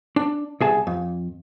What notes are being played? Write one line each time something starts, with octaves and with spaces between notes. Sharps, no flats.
D4
C2 G#4 A5
F2